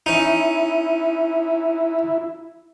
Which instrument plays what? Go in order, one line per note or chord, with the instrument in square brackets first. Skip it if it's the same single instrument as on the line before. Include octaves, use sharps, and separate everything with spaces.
[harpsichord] C#4 D#4 [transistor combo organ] E4